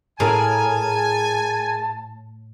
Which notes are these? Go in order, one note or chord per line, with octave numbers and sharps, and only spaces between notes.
A2 G#4 A#4 G#5 A5